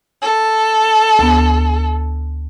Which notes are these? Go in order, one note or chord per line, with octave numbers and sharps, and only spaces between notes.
A4
D2 B3